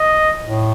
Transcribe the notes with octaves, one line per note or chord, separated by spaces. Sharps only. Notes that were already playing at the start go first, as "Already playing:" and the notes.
Already playing: D#5
A2